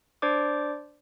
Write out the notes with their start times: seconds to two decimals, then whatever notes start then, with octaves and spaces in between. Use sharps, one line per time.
0.22 D4 C5 D5 D6